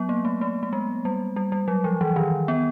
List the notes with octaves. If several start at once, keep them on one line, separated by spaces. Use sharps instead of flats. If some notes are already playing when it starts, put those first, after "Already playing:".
Already playing: F#3 B3
A#3
A3
A3
A3
G#3
G3
G3
G3
F#3
F3
E3
D#3
B3